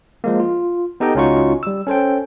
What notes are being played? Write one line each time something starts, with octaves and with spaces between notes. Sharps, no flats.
F3 G#3 A#3
F4
B3 D#4 G4 A4 D#5 G5
C#2 C#4 D#4 F4 F#4 C#6
G3 E6
C#4 A4 C5 G5